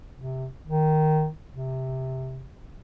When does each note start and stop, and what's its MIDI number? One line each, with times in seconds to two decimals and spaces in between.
0.16 0.47 48
0.67 1.28 51
1.52 2.50 48